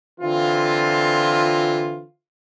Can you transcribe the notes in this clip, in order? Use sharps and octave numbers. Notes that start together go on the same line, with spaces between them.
D3 E3 C4 F4